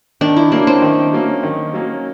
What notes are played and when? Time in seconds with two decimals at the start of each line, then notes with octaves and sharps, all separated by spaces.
0.21 D#3 D4
0.37 E4
0.52 F#3 A#3 C#4 D4
0.67 C4
0.82 D#3
1.13 F#3 A#3 C#4
1.43 D#3
1.74 F#3 A#3 C#4